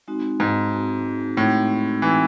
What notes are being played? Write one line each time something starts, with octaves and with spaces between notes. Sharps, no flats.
G#3 C4 D#4 F#4
G#2
G#3 C4 D#4 F#4
A2 G#3 C4 D#4 F#4
E3 G#3 C4 D#4 F#4